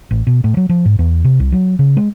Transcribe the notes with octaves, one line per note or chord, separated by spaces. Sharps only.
A1
B2
A2
F#3
F3
G#2
E2
C3
C2
F#3
C#3
G#3